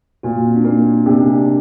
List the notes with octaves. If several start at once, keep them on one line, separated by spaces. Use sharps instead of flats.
A#2 F#4
A#3
C4
D4
A#3 D#4
C3 D4
D#4
D4